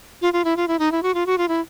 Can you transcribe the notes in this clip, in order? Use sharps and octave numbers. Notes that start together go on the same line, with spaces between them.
F4
F4
E4
F4
E4
D#4
E4
F#4
F4
F#4
F4
E4